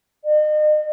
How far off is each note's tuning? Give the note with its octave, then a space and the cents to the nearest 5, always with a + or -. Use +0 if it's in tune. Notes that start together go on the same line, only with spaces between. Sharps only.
D#5 -40